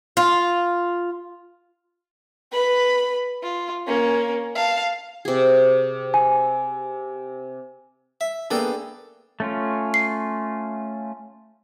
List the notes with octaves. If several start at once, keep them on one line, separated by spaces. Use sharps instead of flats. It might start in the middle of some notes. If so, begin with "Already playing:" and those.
F4
B4 B5
F4
A#3 C#4
F5 A5
C3 G#4
G#5
E5
A#3 B3 D4 G#4 A4 G5
A3 C#4 F4
C7